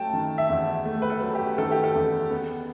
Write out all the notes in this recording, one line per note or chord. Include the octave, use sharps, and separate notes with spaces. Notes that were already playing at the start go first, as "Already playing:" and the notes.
Already playing: F#3 A3 G5 A5
D#3
E5
E2
A3
B4
A4
F#3
G4
D#3 A4
G4
A4
E2
B3